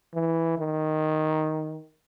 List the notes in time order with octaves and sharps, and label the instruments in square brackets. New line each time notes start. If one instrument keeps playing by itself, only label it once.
[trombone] E3
D#3